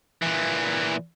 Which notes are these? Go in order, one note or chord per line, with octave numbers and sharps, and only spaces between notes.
A#2 E3